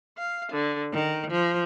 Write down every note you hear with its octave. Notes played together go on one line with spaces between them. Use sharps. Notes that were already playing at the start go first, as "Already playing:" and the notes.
F5
D3
D#3
F3